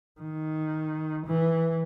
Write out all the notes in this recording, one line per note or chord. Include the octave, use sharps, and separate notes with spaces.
D#3
E3